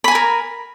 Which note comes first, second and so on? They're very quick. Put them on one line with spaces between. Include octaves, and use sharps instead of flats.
B5 G#5 A#5 A#4